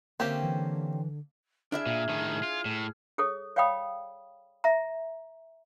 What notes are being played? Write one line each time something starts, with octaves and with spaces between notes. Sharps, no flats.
D3 A#3 C4 C#4 G4 E5
E3
D4 E4 G#4 E5 F6
A#2
A2 D#3
F4
A2
G#4 A4 C#5 D#6
C#5 D5 F5 G5 B5 D#6
E5 A#5